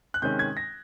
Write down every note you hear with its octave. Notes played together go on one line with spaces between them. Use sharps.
F#6
C3 D#3 G#3 C#4 G6
G#6
A#6